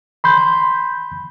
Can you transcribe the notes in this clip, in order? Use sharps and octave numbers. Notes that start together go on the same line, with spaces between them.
B5 C6 G6